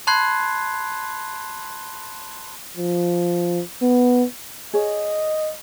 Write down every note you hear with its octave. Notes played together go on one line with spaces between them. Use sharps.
A5 B5 C6 F#6 G#6 C7
F3
B3
G#4 C#5 D#5